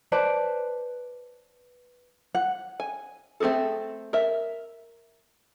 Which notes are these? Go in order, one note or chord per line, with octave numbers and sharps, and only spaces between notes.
B4 C5 D5 A5
F#5
G#5
A3 C4 F#4 G#4 A4
A#4 E5